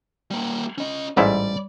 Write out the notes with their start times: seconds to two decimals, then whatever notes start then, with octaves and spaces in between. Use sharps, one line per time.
0.31 G3 A#3
0.78 C#4 D#5
1.17 A1 G#2 G3 E4 D5